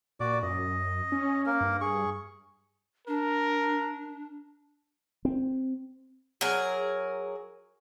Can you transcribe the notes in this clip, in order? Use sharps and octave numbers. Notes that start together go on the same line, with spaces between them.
A#2 F#4 D5 D6
F#2 D#5
C#4
A#3 A#4
G2
G#4 C#6
D4 A#4
C4
F#3 G#4 A#4